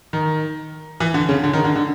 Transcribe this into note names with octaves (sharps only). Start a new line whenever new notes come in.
D#3
E3
D3
C#3
D3
D#3
D3
D3